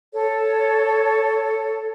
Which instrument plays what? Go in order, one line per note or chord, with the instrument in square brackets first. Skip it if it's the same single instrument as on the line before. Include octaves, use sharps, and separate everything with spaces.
[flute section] A4 C#5